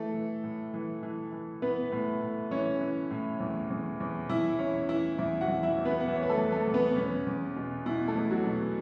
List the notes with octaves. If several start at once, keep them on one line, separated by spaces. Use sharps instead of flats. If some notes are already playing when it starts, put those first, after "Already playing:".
Already playing: E3 A3 A4
E3
A2
E3
E3
E3
E3 B3 B4
A2
A2
E3 C#4 C#5
E3
A2
E2
E2
E2
E2 E4 E5
E2 C#4 C#5
E3 E4 E5
E2 E4 E5
F#4 F#5
E2
E4 E5
E2
B3 B4
F#5
E3 E5
C#5
B4
A3 A4
E2
A3 A4
E2
B3 B4
E2 C#4
E2
B2
B2 E4
A3 A4
E2
F#3 F#4
B2